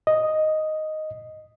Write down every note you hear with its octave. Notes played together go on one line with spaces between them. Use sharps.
D#5